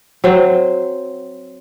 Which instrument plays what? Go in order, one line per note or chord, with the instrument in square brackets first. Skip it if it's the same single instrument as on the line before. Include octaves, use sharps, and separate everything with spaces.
[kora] F#3 C4 C5